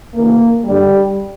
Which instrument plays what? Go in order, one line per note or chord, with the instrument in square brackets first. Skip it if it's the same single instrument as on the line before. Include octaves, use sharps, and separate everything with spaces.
[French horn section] D2 C#3 E3 A#3
G2 D3 G3